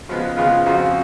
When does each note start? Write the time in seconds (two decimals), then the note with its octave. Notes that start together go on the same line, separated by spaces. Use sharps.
0.09 C#3 F3 G#3 B3
0.37 C#3 F3 G#3 B3 F4
0.66 F2 C#3 F3 F#4